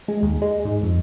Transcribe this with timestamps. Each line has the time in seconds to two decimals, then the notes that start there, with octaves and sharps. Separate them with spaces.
0.08 G#3
0.23 D#2
0.42 G#3
0.65 G#2
0.82 F2